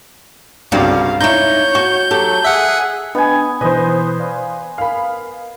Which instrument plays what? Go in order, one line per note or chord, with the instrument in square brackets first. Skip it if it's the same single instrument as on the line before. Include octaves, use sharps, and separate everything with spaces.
[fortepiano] C2 G2 C#3 [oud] F#4 D5 [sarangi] F5
[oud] D#4 E4 [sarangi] C#5 [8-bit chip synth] G6
[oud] F#4 [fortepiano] C#6
[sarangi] F#3 [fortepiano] G4 [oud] A4
[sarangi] G#4 [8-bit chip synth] E5 F#5
[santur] B3 G#5 [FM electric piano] D4 D#5 G5
[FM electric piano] B2 E3 [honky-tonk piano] B4 C5 [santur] D#5
[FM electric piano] D5 F5
[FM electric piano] A#4 G#5 [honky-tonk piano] F5 B5